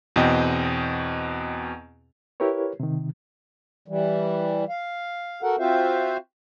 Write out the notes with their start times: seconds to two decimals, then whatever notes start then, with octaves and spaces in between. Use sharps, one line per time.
0.16 E2 B2 C4 D#5 G5
2.40 E4 G4 A#4 B4 C#5
2.80 C3 D#3
3.88 E3 G3
4.69 F5
5.42 F#4 A4 A#4 F#5
5.59 C4 F4 F#4 C5 E5 F5